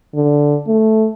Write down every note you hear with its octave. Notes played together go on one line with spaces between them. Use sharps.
D3
A3